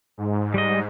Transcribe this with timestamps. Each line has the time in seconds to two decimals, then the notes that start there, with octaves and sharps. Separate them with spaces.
0.18 G#2
0.54 G3 D#5